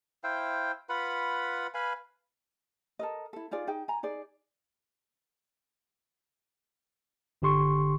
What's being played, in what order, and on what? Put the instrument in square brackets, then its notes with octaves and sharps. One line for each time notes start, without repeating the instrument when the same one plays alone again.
[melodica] E4 C5 F5 G5
F4 B4 F#5 B5
B4 F5 G#5 B5
[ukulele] A4 A#4 D#5
E4 A4
D#4 F4 G#4 D5
D#4 G#4 G5
G#5 A#5
D#4 G#4 D5
[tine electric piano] G1 D3 G4 C6 C#6